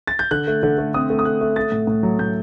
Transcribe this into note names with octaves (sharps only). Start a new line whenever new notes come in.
A6
G6
D3 F#6
A3
D3
A3
C4 D#6
A3
D#6
A3 F#6
A3
A3 A6
A2
A2
F#3
A2 G6